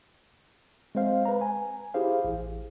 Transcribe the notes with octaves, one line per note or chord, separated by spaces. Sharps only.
G#3 C4 C5 F5
B4 A#5
G#5
E4 G4 G#4 C5 F5
A1